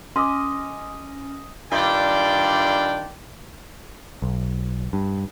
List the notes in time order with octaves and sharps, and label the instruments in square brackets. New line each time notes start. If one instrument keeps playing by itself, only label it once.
[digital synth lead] C#4 [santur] D#5 G#5 [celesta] C6 D6
[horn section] G2 D#3 D4 F4 D5 G5
[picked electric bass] B1
G2